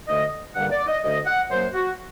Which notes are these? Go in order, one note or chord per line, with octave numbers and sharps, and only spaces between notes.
D2 D3 A3 D#5
G2 D3 G3 A#3 F#5
D5
D#5
D2 D3 A3 D#5
F#5
F#2 F#3 A#3 C5
F#4